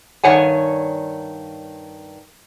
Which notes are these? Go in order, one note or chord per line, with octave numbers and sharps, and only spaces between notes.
G2 D#3 C#5 F#5 G#5